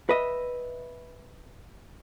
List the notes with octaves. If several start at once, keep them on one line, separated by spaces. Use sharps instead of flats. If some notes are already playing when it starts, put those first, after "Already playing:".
B4 D#5 E5